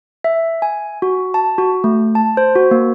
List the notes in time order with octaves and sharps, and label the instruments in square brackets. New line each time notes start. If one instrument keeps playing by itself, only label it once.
[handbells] E5
G#5
F#4
A5
F#4
A3
A5
C5
F#4
A#3